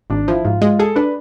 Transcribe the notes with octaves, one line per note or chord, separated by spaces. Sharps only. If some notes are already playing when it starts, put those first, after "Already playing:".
G#1 D4
F3 E4
G#2 F4
G#3 F4
G#4 A4
D4 B4